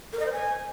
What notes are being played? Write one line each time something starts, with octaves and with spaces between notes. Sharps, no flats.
A#4
D#5
C5
G#5